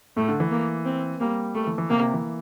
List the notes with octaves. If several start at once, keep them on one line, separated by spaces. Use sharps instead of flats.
A2 A3
D3
E3
A#3
C4
G3 A#3
G3 A3
E3
E3
C3 A#3
C3
E3